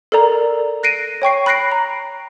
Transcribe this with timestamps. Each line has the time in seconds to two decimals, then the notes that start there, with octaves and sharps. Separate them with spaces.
0.12 A4 A#4 D5 A#5
0.83 F#6 A#6 C7 D7 D#7
1.22 C#5 G5 C#6 C7
1.46 B5 F#6 A#6 C7 D7
1.72 A#5